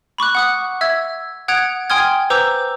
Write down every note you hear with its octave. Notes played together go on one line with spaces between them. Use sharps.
B5 C#6 D6 F#6
F#5 D#6 F#6
E5 E6 G#6
F#5 D#6 F#6 G#6 D7 F7
G5 G#5 C6 D#6 F6 G#6
B4 C5 A#5 D6 E6 G6